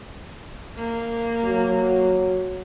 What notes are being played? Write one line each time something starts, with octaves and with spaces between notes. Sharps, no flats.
A#3
F#3